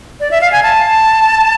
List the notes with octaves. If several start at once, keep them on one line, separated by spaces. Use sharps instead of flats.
D5
E5
F5
G#5
A5